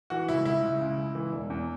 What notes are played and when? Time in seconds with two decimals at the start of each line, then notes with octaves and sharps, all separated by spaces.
0.10 E3 F#4
0.28 C#2 E4
0.45 C#2 E4
0.63 C#2
0.81 C#3
0.98 C#2
1.15 E3
1.32 E1
1.50 E2